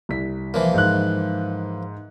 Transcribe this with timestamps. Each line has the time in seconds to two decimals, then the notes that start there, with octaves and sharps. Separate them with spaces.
0.09 C2 B6
0.54 E3 F3 A#3
0.74 G#2 F#6